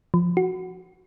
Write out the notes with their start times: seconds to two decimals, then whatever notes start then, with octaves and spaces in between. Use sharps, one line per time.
0.14 F3
0.37 F#4